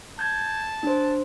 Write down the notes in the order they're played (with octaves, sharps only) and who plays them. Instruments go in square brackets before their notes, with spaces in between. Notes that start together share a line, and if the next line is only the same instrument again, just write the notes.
[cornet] A5 [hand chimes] G6 G#6
[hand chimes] D4 C5